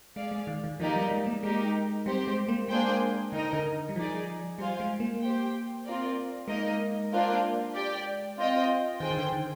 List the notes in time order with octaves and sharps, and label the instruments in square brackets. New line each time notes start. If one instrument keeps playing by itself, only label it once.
[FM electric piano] G#3 [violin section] G#4 D5 F5
[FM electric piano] G#3
D#3
D#3
[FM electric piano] F3 [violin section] A#3 D#4 G4 A#4 D5
[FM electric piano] G3
G#3
A#3
[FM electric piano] G#3 [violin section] D#4 G4 A#4
[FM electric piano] G3 [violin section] C4 G4 C5
[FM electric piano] G#3
A#3
[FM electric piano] G#3 [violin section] A#3 D4 G#4 C5 G5
[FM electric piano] D3 [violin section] D#4 A#4 D#5
[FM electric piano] D3
G3
[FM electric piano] F3 [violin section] D#4 G#4 D5
[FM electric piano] G3 [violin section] F4 C5 F5 G#5
[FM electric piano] G#3
A#3
[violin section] G4 C5 G5
C4 F4 A#4 D5
[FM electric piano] G#3 [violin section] A#3 D#4 A#4 D#5
[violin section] A#3 D4 F4 C5 F5
G4 D5 G5
C4 F4 C5 D#5 G5
[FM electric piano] D#3 [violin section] G#4 C5 G5
[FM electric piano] D#3
D3
D#3